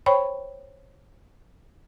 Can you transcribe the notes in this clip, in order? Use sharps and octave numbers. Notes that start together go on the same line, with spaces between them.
C5 C#5 G5 B5 C#6